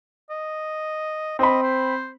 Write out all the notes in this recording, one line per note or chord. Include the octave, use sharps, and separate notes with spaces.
D#5
C4 D#5 B5
C5